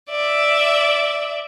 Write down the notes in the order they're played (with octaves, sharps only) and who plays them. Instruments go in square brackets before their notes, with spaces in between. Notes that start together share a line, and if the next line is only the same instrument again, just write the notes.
[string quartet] D5 E5